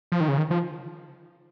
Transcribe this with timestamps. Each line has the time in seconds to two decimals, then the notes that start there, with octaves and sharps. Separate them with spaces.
0.12 F3
0.20 D#3
0.28 C#3
0.38 D#3
0.51 F3